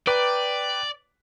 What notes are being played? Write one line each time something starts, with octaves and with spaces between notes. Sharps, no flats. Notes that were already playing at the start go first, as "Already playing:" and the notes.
B4 D5 G5 A#5 D6